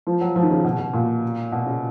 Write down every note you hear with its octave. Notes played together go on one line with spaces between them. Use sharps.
F3
F#3
F3
D#3
C#3
B2
B2
A#2
B2
C#3